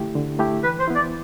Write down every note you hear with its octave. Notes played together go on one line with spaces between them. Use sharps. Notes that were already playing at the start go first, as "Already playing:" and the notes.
Already playing: D3 A3 E4 G4
D3
A3 E4 G4
E3 B4
C5
B3 E4
D5